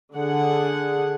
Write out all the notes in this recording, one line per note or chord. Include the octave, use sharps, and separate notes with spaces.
D3 G#4 F#5